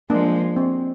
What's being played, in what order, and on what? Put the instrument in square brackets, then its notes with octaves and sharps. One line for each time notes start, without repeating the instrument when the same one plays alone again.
[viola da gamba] F3 G#3 [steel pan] A#3 D4
[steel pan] C4